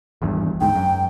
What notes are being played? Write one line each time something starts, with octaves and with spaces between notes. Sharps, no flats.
G#1 E2 G2
D2 G#2 G5
F#2